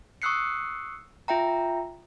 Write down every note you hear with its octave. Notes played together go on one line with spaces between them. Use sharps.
C#6 D#6 E6 F#6 C7 C#7
F4 E5 G5 A#5